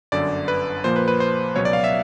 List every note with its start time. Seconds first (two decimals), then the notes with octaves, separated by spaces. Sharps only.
0.12 G1 F#2 D3 D5
0.48 B4
0.84 A#2 F3 A#3 C5
0.96 B4
1.08 B4
1.20 C5
1.55 C#2 B2 F#3 B3 C#5
1.65 D5
1.73 F5
1.84 E5